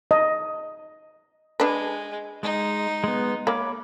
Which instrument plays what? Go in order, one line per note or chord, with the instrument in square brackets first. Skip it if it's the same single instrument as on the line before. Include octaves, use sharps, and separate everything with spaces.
[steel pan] D#5
[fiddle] G#3 [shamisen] D4 B4
[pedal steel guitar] G#3 [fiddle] D#4
[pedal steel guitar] G#3 B3
[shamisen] A#3 [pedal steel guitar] C#5 B5 D6